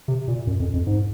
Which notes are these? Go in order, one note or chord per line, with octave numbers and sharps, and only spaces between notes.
C3
A#2
F#2
F2
F2
G#2